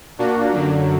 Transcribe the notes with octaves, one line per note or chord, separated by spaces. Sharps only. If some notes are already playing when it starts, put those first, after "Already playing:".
A#2 A#3 D4 F#4
F#2 D3 F#3